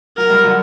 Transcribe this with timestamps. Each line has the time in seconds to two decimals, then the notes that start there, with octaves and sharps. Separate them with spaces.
0.17 F#3 A#4
0.30 G3
0.44 D3 F#3